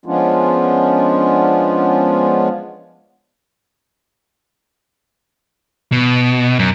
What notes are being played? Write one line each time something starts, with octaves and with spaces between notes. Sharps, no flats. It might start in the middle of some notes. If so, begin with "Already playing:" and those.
F3 G#3 B3 C#4 D4 F4
B2
F#2